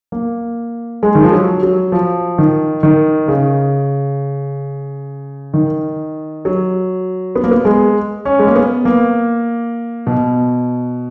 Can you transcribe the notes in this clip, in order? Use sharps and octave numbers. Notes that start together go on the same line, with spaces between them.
A#3
G#3
D#3
F3
F#3
F#3
F3
D#3
D#3
C#3
D#3
F#3
B3
A#3
B3
G#3
C#4
G#3
A#3
B3
A#3
B2